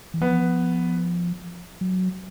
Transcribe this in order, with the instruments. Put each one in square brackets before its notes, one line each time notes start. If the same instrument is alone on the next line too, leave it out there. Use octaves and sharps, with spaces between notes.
[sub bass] E3
[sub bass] F3 [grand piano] B3
[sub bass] F#3